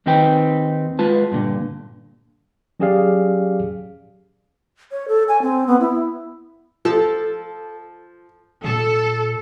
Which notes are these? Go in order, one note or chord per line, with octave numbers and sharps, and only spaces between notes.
D#2 D#3 C4 D#4 B4 G5
G#3 F4 B4 A5
G2 A#2 D3
F#3 C#4 G4 G#4 D5 F5
C#5
A4
G#5
C4
B3
E4
F3 A4
A#2 A4